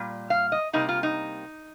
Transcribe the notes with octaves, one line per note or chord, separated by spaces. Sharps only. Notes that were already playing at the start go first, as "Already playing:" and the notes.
Already playing: A#2 G3
F5
D#5
C3 G3 A#3 D#4
F4
D#4